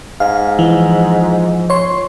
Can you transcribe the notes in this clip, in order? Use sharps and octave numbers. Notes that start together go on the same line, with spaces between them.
G#2 F5
E3 F3
C#5 C6